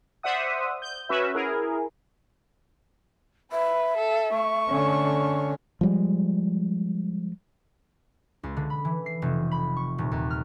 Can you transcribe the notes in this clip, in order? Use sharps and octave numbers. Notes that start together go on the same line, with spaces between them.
C5 D5 E5 F#5 D#6
G6
C#4 F#4 B4 E5
E4 G#4 A#4
B4 E5
A4
A3 C#6
D3 C#4
F3 G3 G#3
C#2
D3
B5
E3
C7
F1
B5
C#6
D#1
D#2
F6